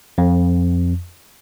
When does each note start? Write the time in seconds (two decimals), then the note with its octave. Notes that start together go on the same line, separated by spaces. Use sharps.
0.18 F2